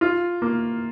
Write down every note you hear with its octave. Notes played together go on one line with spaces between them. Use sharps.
F4
A#3